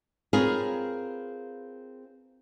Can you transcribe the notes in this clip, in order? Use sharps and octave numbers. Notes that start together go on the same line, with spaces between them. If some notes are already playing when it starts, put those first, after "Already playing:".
C4 F4 G#4 A#4 B4 C#5